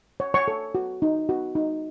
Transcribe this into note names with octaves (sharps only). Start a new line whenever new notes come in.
C#5
C#5 C#6
A4
F#4
D#4
F#4
D#4